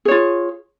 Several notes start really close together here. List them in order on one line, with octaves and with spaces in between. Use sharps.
G#4 C#5 F4